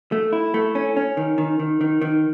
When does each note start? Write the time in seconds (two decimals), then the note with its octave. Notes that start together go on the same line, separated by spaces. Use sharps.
0.12 A3
0.33 E4
0.54 A3
0.75 C#4
0.97 C#4
1.17 D#3
1.38 D#3
1.60 D#3
1.81 D#3
2.02 D#3